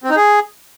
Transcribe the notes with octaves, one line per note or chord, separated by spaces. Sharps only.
C4
D#4
G#4